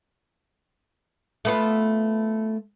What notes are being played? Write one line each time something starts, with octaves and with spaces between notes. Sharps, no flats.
A3 B3 F4